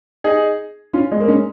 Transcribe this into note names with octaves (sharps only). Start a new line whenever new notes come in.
D#4 G#4
C#4 F4
G#3
A#3
G#3 C#4